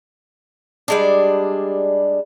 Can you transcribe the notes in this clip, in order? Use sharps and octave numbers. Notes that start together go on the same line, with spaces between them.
G3 G#3 D4